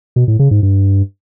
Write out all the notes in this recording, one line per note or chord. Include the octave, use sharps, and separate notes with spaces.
B2
A2
C#3
G#2
G2